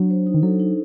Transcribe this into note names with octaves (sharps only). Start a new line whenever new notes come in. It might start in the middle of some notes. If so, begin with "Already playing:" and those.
Already playing: F#3 D4
C5
D#4
D#3
F#3 A4
D#4